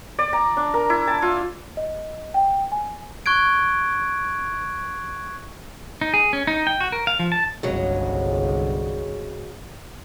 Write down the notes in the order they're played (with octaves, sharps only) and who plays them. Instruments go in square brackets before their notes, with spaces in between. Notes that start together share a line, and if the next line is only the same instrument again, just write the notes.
[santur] D5
A#5
D4
A#4
E4
A5
F4
[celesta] D#5
G5
G#5
[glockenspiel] C#6 F#6 G#6 D7
[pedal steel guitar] D#4
G#4
C#4
D#4
G5
F#4
A#4
F5
F3
A5
[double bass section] G1 C2 G2 [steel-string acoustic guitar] C#3 F#3 G#3